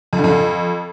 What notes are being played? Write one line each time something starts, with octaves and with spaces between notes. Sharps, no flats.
F2
D3
F2